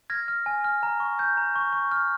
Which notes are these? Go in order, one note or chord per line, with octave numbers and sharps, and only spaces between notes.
F6 G#6 A#6
F6
G#5
F6
A#5
C#6
G6
A#5
C#6
C#6
F6